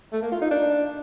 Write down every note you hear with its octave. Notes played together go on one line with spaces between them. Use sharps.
A3
A#3
F4
D#4
D4